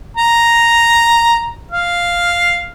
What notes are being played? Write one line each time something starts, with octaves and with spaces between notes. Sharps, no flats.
A#5
F5